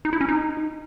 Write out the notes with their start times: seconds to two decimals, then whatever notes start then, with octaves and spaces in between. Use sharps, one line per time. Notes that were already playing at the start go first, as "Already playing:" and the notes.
0.05 D#4
0.13 E4
0.21 C#4
0.29 D#4